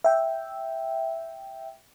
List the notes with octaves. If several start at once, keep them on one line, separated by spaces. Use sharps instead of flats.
E5 G5